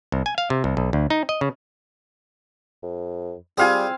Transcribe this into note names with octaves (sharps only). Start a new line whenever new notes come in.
C2
G#5
F5
C3
C2
B1
D2
D#4
D#5
C#3
F2
G3 C4 F4 G4 G#4 F5 G#5